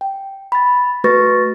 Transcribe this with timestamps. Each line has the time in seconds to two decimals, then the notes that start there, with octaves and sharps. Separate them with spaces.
0.01 G5
0.52 B5 A6
1.04 A3 F#4 B4 C#6 A6 A#6